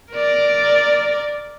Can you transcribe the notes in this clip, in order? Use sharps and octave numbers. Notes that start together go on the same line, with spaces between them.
A#4 D5